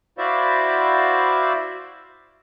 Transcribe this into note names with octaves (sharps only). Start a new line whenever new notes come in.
E4 F#4 C5 D5 E5 F5